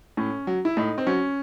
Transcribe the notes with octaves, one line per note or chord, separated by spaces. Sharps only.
A2 C#4
F#3
E4
A2 D#4
C4
F#3 C#4